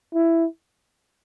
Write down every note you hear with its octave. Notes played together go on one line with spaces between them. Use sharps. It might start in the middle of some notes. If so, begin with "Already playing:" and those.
E4